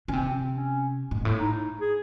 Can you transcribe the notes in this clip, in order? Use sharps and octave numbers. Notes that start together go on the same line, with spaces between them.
C#3 C#4
C3 C4
C#4
G#2
A2
D#4
G#4